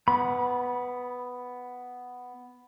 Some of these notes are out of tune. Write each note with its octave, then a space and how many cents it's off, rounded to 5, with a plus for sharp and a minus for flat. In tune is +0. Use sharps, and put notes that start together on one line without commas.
B3 +5 B5 -20